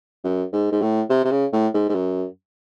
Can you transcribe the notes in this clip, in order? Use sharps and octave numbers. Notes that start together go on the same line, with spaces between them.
F#2
G#2
G#2
A2
C3
C3
C#3
A2
G#2
G#2
F#2